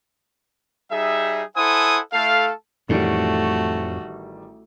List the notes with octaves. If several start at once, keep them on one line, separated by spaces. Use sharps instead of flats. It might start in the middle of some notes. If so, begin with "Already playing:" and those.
G3 D#4 G#4 E5
E4 A4 C5 F#5 G#5 D#6
A3 E4 A4 F5
A1 F2 A2 D#3 G3 A3 F#4